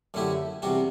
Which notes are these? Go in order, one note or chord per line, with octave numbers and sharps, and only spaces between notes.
F#2 D3 A3 E4 G4
E2 C3 G3 D4 F#4